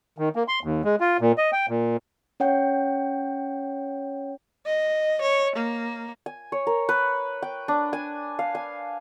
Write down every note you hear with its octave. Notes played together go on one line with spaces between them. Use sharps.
D#3
A#3
C6
D#2
G#3
F4
A#2
D#5
G5
A#2
C#4 C#5 F#5 G5
D#5
C#5
A#3
G#5
C#5
A#4
B4
G5
D4
G#5
F5
G#5